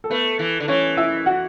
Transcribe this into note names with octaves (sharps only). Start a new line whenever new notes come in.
A4
A3 B3 B4
E3
D3
E3 C#4 C#5
E4 E5
F#4 F#5